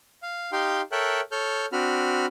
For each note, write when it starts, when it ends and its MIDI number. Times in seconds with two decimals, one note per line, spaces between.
0.23 0.51 77
0.52 0.81 63
0.52 0.81 67
0.52 0.81 77
0.52 0.81 79
0.52 0.81 84
0.92 1.21 69
0.92 1.21 70
0.92 1.21 73
0.92 1.21 76
0.92 1.21 79
0.92 1.21 90
1.32 1.66 69
1.32 1.66 73
1.32 1.66 89
1.32 1.66 91
1.73 2.26 60
1.73 2.26 62
1.73 2.26 66
1.73 2.26 83
1.73 2.26 89